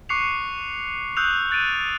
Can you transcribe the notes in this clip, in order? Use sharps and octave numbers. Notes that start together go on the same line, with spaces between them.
C#6 D6 F#6 C7 C#7 F7
D#6 E6 F#6 G6 F7
F#6 A6 D7 D#7